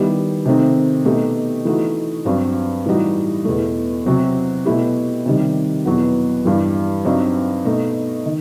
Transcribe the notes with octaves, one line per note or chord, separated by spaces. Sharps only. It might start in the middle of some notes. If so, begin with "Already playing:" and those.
Already playing: D#3 G3 B3 E4 G4
C3 D#3 A3 C4 D#4
B2 A3 D#4 G4
E3 A3 D#4 F#4
G2 F#3 C4
A2 E3 G3 D#4 F#4
E2 B2 A3
C3 F#3 C4
B2 A3 E4 G4
C3 D#3 G3
E2 B2 F#3 B3 F#4
G2 E3 G3
G2 F#3 C4 D#4
B2 A3 D#4
D#3